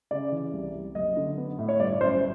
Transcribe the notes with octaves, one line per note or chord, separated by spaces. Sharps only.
C#3 D5
E3
C2
C2
F#1 D#5
D3
B3
A2
C#5
G1 D5
F#2 C5